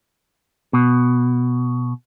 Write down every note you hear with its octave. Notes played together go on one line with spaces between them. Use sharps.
B2